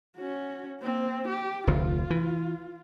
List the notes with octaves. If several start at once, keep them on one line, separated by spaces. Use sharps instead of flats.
C#4 F#4
A#3 C4
G4
F1 D2 F4
E3